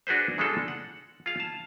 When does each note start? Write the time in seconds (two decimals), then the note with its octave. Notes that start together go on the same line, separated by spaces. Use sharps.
0.07 D4 F#4 G#4 B4 C5
0.38 C#3 G3 G#3 D4 F4 A4
0.68 F#5
1.26 F4 G#4 F5
1.40 A5